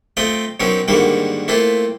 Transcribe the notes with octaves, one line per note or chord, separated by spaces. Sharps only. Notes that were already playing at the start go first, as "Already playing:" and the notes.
A3 C4 F4 D#5 G5
B2 F#3 C4 C#4 D#4 A#4
G#2 D3 D#3 G3 A#3 F#4
A3 A#3 C4 E4 F4